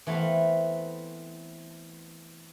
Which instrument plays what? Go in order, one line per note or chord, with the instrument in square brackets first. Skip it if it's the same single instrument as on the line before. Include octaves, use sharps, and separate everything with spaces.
[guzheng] E3 A3 B3 C4 F5